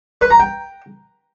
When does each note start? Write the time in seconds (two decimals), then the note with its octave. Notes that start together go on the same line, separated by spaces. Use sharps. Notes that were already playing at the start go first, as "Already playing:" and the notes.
0.21 B4
0.30 A#5
0.40 G5